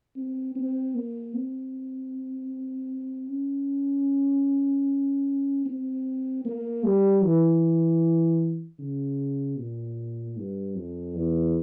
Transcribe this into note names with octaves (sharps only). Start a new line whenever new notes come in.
C4
C4
A#3
C4
C#4
C4
A#3
G3
E3
C#3
A#2
G2
F2
E2